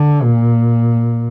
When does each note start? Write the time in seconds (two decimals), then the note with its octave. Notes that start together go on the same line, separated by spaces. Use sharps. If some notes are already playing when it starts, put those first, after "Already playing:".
Already playing: D3
0.23 A#2